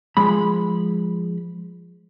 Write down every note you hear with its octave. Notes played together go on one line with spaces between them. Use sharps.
F3 G#3 B5